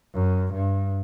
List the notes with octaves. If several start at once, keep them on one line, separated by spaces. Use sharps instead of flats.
F#2
G2